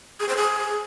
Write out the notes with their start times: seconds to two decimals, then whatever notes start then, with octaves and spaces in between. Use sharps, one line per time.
0.20 G#4
0.29 C5
0.37 G#4